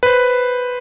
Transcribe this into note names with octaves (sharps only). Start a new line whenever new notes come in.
B4 C5